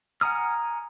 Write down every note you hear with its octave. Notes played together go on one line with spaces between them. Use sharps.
F#5 G#5 A#5 D#6 F6